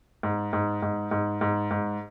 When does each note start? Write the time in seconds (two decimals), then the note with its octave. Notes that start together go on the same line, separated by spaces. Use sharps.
0.23 G#2
0.53 G#2
0.82 G#2
1.11 G#2
1.41 G#2
1.71 G#2